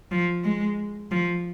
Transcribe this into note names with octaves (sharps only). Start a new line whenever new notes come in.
F3
G#3
F3